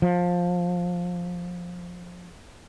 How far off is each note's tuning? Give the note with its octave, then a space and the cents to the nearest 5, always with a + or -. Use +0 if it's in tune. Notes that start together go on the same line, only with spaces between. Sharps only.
F3 +15